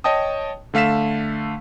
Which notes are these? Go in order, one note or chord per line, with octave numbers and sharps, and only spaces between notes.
C#5 D#5 G5 A5 D#6
D3 A3 F5 B6 E7